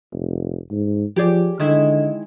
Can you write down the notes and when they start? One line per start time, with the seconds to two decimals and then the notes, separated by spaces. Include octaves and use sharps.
0.13 F1
0.71 G#2
1.16 F3 G4 G#4 D5
1.60 D3 D#3 G#3 E4